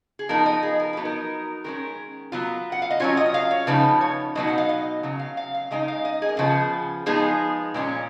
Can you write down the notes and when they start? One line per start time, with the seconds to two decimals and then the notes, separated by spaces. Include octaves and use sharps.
0.19 G#4
0.29 F3 B3 D#4 A#4
0.46 D#5
0.63 G#4
0.80 A#4
0.93 F#3 B3 D#4 B4
1.05 A#4
1.64 D#3 G#3 C#4 A#4
2.32 F#3 B3 F4
2.72 F#5
2.82 F5
2.91 D#5
3.00 F#3 C#4 F4 C#5
3.17 D#5
3.34 F5
3.51 C#5
3.67 C#3 F3 B3 D#4 B4
4.01 C#5
4.35 B2 F#3 B3 D#4 D#5
4.47 F#5
4.58 F5
4.69 D#5
5.03 C#3 F#3
5.19 F5
5.37 F5
5.55 F5
5.71 C#3 G#3 D#4 D#5
5.88 F5
6.05 D#5
6.22 G#4
6.29 A#4
6.37 C#3 F3 B3 G#4
7.06 F3 G#3 B3 D#4 G#4
7.74 A#2 G#3 C#4